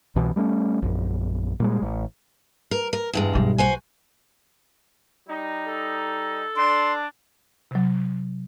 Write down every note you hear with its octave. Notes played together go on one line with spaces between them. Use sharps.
C2 B2 E3
G3 A3 B3 C#4
A#1 F#2
A#2 G3 G#3
A1
A#4
A#4
E2 G2 G#3
B1 G3
F#4 C5 G#5
G3 D#4
A4
D4 C6
C3 F#3